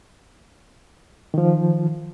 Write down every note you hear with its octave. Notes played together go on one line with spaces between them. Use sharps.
D#3 F3